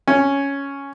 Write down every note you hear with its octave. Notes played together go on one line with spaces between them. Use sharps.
C#4